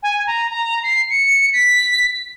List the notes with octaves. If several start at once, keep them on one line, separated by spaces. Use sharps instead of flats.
G#5
A#5
A#5
C7
C#7
B6